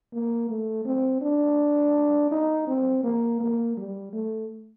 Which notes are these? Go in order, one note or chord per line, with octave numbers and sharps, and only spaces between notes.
A#3
A3
C4
D4
D#4
C4
A#3
A#3
G3
A3